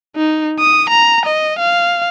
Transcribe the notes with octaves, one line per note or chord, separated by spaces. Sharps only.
D#4
D#6
A#5
D#5
F5